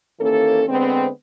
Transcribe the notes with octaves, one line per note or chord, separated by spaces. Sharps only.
D#2 E3 A#3 C#4 A4
D3 G#3 B3 C4